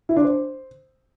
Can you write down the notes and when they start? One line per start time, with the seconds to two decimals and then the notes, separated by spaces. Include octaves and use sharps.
0.09 E4
0.16 D4
0.24 C5